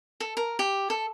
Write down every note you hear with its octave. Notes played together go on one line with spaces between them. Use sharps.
A4
A#4
G4
A4